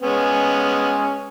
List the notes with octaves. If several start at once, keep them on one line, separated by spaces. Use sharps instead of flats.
G#3 B3 C#4